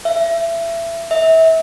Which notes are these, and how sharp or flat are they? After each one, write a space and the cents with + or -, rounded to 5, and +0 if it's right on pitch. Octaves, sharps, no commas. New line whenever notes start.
E5 +25
E5 -30